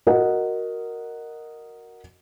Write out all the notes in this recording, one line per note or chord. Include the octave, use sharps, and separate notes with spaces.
F#4 A#4 D#5 F#5